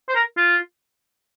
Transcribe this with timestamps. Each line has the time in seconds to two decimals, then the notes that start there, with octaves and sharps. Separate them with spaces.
0.09 C5
0.15 A#4
0.37 F4